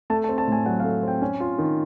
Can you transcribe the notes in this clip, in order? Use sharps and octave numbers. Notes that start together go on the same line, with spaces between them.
A3 A5
A5
C4
A5
A2 G#5
F#3 F#5
F5
A3
C4 G5
C#4 G#5
F4
D#3